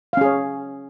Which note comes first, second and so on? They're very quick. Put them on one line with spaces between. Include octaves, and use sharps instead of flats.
F5 C#4 G#4 C#5